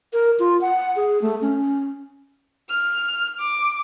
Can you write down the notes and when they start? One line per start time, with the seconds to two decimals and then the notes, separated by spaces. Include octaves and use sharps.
0.13 A#4
0.39 F4
0.61 F#5
0.96 G#4
1.22 A3
1.41 C#4
2.69 F6
3.40 D6